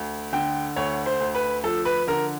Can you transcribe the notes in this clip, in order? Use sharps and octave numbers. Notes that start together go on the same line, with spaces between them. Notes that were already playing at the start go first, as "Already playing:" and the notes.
Already playing: D2
D3 G5
D2 C#5
C5
D2
B4
F3 A4
B4
D3 A#4